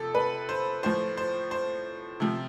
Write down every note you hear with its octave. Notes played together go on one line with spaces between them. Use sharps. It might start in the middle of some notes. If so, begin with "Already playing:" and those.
Already playing: C3 F3 A4
B4
C5
A2 F3 C5
C5
C5
C3 F3